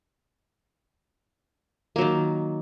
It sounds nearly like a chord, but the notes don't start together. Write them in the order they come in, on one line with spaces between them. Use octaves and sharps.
A#3 F#3 D#3